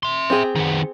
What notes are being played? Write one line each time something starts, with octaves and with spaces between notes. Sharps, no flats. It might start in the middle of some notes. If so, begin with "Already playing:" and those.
E5 C6
C4 G4 G#4
D#3 B3